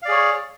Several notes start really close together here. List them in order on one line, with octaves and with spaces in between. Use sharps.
F5 D5 G#4 C#5